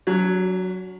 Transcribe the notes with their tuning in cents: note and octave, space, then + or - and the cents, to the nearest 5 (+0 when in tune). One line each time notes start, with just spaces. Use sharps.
F#3 +0 D4 -45